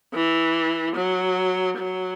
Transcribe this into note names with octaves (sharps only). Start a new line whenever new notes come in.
E3
F#3
F#3